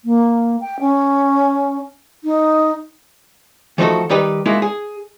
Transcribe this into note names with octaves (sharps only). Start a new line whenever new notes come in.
A#3
G5
C#4
D#4
E3 F3 A3 D#4 F#4 A4
D#3 G3 D#4 G4 B4
G#3 A#3 D#4 E4 F#4
G#4